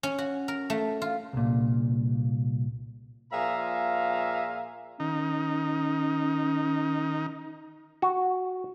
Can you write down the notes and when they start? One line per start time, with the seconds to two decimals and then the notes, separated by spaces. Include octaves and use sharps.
0.03 C#4
0.18 F#4
0.48 A#4
0.70 A3
1.02 F4
1.33 C2 A#2
3.32 A#2 F3 G#4 E5 F5 A#5
5.00 D#3 C#4 D#4
8.02 F#4